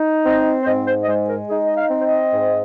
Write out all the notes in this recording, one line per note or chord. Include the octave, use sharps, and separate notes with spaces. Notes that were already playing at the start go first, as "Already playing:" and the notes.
Already playing: D#4
C4 D#5
C5
G#2 D#5
C5
D#5
G#3 C5
A#4
D#4 G#4
D#5
F5
C4
C5
D#5
G#2